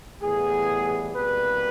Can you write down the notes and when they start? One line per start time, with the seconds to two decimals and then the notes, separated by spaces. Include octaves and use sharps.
0.21 A2 E3 G3 B3 G#4
1.14 C2 B2 G3 A#3 B4